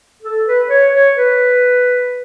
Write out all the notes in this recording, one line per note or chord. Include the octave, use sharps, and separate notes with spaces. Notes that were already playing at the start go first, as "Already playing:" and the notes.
A4
B4
C#5
C#5
B4